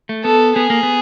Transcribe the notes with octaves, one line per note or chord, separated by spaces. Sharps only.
A3
B3 A4
B3 G#4
A#3
B3